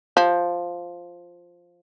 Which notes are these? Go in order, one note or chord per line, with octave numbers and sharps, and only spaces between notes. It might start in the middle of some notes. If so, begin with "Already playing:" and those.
F3